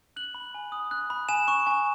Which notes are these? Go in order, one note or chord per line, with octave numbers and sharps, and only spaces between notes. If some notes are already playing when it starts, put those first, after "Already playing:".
F#6 F#7
B5
G#5
D#6
F#6
B5
G#5 E7
C#6
G#5